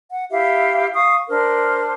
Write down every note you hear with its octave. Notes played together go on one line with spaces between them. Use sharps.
F#5
E4 G4 E5 F5
F5 C#6 D#6
D4 A#4 C5